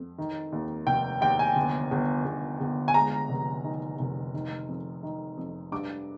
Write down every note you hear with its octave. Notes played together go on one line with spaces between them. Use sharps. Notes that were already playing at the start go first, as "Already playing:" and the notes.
Already playing: F2
D#3
D#2
F1 G5
D#2 G5
G#5
G1
G1
G1
G1
G#5
G#3 A#5
F1
D#3
F1
D#3
F2
D#3
F2
G2 D6